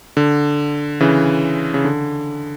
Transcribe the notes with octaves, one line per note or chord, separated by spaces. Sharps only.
D3
C#3 E3
C#3
D3